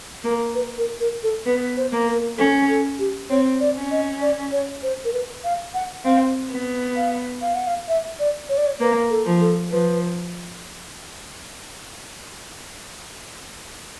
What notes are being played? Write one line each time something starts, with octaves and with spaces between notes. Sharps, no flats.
A#3 A#4
B4
A#4
A#4
A4
B3 B4
C5
A#3
A#4
C#4 A4
A4
G4
C4 C#5
D5
C#4
D#5
D5
C#5
C5
A#4
B4
F5
F#5
C4 F5
B3
F5
F5
F#5
F5
E5
D5
C#5
D5
C#5
A#3 B4
A4
F3
A4
F3 B4